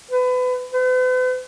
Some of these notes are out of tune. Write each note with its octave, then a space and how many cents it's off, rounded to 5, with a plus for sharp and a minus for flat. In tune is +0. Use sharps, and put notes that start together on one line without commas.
B4 +30
B4 +45